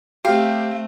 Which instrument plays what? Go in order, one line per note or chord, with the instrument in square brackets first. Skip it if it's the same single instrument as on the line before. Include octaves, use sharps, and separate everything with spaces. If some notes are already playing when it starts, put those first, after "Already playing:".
[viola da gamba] A3 C4 [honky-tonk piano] G4 [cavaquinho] F5